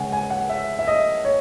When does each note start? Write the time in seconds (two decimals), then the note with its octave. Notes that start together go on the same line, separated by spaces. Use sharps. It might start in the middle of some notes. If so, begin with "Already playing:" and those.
Already playing: C#3 G#3 C#4 F#5 G#5
0.12 G#5
0.30 F#5
0.49 E5
0.79 E5
0.87 D#5
1.25 C#5